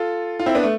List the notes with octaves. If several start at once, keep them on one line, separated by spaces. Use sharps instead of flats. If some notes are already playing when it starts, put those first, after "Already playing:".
Already playing: F4 A4
F4
C4 E4
B3 D4
A3